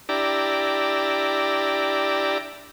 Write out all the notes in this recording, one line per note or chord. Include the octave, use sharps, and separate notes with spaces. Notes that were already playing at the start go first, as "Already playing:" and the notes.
D4 E4 G4 D5 A#5